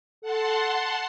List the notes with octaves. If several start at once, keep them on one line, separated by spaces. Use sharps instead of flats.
A4 F#5 A5 C6